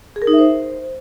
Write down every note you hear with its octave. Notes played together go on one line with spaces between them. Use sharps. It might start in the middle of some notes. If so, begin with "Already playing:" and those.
G#4
A#4
D#4
E5
C5